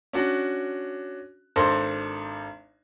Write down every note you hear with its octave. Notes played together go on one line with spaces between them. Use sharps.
C#4 D4 F#4
G#1 D4 A4 C5 C6 A#6